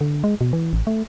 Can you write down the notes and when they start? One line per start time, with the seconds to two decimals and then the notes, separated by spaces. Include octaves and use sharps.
0.01 D3
0.24 G#3
0.41 B2
0.53 E3
0.73 A1
0.87 A3